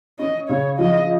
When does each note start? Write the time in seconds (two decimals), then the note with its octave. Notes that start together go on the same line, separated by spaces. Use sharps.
0.19 C#4 D#5
0.49 C#3 C#5
0.79 F3 D#5